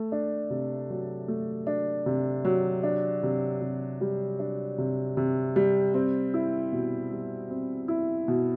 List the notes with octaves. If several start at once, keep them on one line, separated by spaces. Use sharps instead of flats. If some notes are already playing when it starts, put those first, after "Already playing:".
Already playing: A3
D4
C3
F#3
A3
D4
C3
F#3
D4
C3
C3
G3
D4
C3
C3
G3
C4
E4
B2
G3
C4
E4
B2